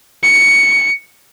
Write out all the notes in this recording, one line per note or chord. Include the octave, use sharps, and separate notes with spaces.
C#7